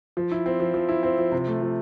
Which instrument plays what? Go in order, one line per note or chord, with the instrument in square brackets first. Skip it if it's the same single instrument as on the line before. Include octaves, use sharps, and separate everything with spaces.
[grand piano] F3
E4
C4
F3
F3
E4
C4
F3
C3
A3
F3